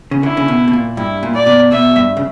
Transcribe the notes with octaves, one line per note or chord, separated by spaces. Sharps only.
C#3
D3 E4
C#3
B2
B2
A#2
G2 E4
A#2
D5
B2
B2 E5
G2
C#3